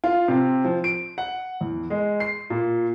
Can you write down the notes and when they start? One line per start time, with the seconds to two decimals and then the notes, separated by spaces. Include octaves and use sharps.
0.04 F4
0.28 C3
0.64 F3
0.84 D7
1.18 F#5
1.61 E2
1.90 G#3
2.20 C7
2.50 A#2